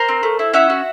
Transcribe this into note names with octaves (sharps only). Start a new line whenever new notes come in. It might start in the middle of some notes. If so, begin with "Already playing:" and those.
Already playing: A#4 C5
C4
A3
E4
C#4 E5 F#5
F#4